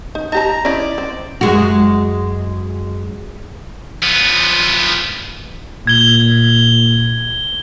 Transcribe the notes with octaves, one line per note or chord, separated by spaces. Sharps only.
D#4
D#4 G4 A5 A#5
C#4 E4 D5 D#5
C4
F#2 G#3 F#4
F3 B3
A#2 G#6 G7